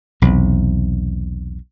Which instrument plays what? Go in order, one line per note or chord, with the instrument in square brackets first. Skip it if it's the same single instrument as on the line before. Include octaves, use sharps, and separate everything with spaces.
[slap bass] B1 E2 C3